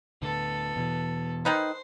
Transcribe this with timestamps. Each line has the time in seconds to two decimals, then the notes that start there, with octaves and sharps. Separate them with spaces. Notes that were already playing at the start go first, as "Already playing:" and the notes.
0.22 D2 A2 D3 B3 A4
0.75 E2 B2 E3
1.45 D#3 D#4 B4 C5